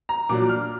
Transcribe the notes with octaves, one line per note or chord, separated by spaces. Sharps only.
A#5
A#2 F#3 D4 D6
F6